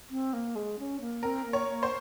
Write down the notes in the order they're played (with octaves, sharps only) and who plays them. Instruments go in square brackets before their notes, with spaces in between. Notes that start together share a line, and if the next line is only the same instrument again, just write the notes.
[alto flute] C4
A#3
G#3
C#4
A#3
[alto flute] C4 [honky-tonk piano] A#4
[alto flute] A#3
[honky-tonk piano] C#5
[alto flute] A#3
[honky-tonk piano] C5